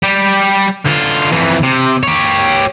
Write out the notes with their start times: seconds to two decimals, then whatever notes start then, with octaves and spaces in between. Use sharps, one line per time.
0.03 G3 G4
0.85 D3 F4
1.31 F2 E3
1.63 C3
2.03 G4 C#5